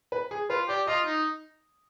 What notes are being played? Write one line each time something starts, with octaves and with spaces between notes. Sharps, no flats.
B4
G#4
F4 B4
G4 D5
F4 D#5
D#4